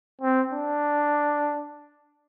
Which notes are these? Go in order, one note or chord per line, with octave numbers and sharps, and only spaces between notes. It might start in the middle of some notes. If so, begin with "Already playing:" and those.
C4
D4